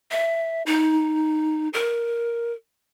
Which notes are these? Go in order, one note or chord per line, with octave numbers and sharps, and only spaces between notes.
E5
D#4
A#4